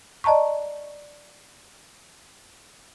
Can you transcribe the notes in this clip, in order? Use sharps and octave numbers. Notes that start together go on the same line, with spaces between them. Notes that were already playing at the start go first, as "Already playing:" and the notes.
D5 D#5 A5 A#5 C#6